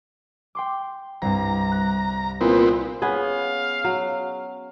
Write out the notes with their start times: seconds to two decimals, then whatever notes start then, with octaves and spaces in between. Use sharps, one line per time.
0.55 G5 C6 D6
1.22 C2 G2 A#5
1.72 F#6 A#6
2.41 A#2 B3 C4 E4
3.02 B3 C#4 G#4 F5
3.84 F#3